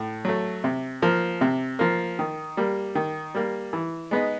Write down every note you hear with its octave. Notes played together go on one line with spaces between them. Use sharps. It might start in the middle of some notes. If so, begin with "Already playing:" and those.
Already playing: A2
F#3 A3
C3
F3 A#3
C3
F3 A#3
D#3
G3 A#3
D#3
G3 A#3
E3
G#3 B3 D#4